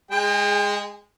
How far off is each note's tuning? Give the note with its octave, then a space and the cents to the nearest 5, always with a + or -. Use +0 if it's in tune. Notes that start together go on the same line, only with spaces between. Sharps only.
G#3 -10 G#4 +0 G5 +40